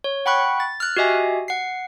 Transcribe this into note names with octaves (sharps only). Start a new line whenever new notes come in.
C#5
F#5 G5 B5 C#6 F#6
A6
F6 F#6
F#4 G4 D#5 E5 G#5
F#5 C7